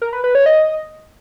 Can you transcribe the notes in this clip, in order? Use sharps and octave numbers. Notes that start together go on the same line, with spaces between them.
A#4
B4
B4
C#5
D#5